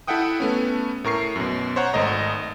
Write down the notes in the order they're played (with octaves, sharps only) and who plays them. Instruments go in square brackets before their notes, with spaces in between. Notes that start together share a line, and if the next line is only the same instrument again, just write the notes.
[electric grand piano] E4 A4 E5 F#5 G5 D#6
A3 B3 C#4
A2 A#4 C#6 C7
F#2 B2
C5 C#5 F#5 A#5
G#1 A3 D#5 A#5